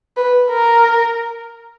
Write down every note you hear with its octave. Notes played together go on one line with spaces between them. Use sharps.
B4
A#4